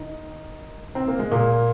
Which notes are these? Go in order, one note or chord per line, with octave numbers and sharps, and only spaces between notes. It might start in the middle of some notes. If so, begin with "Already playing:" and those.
Already playing: D#3 D#4
C4
A#3
G#3
A#2 A#3